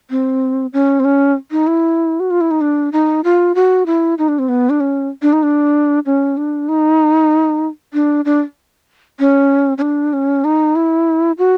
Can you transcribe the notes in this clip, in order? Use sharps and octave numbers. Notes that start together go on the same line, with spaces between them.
C4
C#4
C4
C#4
D#4
E4
F#4
F4
E4
D#4
D4
D#4
F4
F#4
E4
D#4
D4
C4
B3
D4
C#4
D4
D#4
D4
C#4
D4
D#4
D4
D4
C#4
C#4
D4
C#4
D#4
E4
F#4